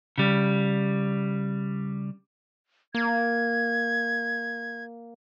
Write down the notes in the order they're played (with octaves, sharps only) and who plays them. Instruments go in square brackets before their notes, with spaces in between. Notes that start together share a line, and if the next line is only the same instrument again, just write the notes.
[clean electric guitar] C#3 G3
[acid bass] A#3 [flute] G#6